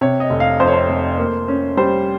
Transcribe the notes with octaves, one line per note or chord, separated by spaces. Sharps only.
C3 C#5
D#5
F1
F5
F2 C5
C#5
C5
F1
A#3
C#4
G3 C5